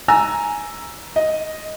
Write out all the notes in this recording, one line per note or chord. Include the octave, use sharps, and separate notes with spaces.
G#5 A#5 E6
D#5